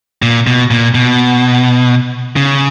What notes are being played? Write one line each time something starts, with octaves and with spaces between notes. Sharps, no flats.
A#2
B2
A#2
B2
C#3